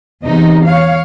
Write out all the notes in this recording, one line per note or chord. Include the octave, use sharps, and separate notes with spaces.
E2 C3 D#4
C#5 F5